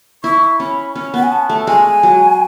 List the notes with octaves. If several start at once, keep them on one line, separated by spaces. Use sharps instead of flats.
E4 C#6
C#4 B5
C#4
B3 F#5
G#5
A5
A3
G#3 G#5
F#3